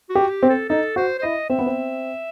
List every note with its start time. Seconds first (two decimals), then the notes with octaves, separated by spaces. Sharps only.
0.10 F#4
0.15 G4
0.30 G4
0.43 C4
0.49 A4
0.69 D#4 A4
0.96 F#4 C5
1.19 C5
1.22 E4 D#5
1.50 C4 E5
1.59 B3
1.66 C4